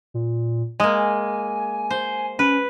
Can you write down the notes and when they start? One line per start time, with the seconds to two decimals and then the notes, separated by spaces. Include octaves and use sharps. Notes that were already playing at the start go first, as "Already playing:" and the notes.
0.14 A#2
0.80 G#3 A#3 G#5
1.91 C5
2.39 C#4 B4